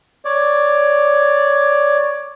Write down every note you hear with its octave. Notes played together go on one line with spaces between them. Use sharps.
C#5 D5